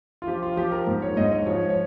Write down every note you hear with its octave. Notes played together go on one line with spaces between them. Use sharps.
F4
F3 G4
F4
F3 G4
A#4
G#2
C#5
G#2 D#5
C#5
F3 C#5
C#5